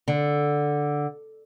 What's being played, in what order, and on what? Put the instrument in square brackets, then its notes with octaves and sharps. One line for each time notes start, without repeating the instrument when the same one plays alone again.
[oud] D3